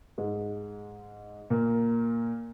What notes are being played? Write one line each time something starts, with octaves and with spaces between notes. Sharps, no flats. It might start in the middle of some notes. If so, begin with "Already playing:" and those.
G#2 G#3
A#2 A#3